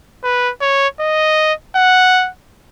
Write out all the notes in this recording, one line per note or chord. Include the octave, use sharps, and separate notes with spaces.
B4
C#5
D#5
F#5